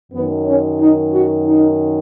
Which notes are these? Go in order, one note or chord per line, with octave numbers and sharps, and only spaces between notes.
F#2 D#3 B3
C#4
D#4
F#4
D#4